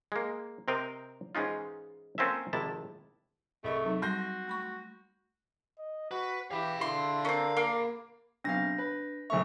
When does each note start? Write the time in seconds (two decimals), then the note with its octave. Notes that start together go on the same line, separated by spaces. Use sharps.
0.12 G#3 A#3
0.68 C3 C4 A#4 C5 D#5 G5
1.35 G#2 E3 G#3 C#4 D#4 F4
2.18 A#3 C4 C#4 F4 A4 E5
2.53 G#1 F2 C3 D#3 E4 A5
3.64 C2 A3 G#4 A#4 D#5 C#6
3.85 F#3 C4 D#4
4.02 G3 F#4 C6 G6 A#6
4.48 A3 B5 C#6
5.79 D#5
6.11 F#4 B4
6.51 E3 G4 F5 B5
6.81 D3 E4 C6
7.25 C4 C#4 A#4
7.57 A#3
8.44 B1 C3 D4 F5 A#6
8.78 B4
9.30 A#1 A3 E5 C#6